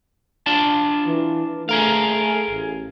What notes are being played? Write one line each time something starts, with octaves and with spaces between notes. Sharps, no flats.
D4 F4 A5
E3
A3 G#4 A#4 F5
A1